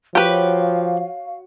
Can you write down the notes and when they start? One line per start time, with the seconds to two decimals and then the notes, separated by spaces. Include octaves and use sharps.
0.15 F3 F#4 G4 B4 C#5 F5